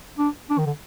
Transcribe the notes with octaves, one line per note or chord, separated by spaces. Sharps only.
D4
D4
D#3
D3